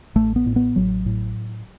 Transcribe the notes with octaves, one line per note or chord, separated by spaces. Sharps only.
A1 A3
B3
A2
B3
A1 F#3
A2